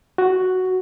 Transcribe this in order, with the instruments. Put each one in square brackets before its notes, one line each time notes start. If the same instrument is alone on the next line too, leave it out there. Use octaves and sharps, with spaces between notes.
[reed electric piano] F#4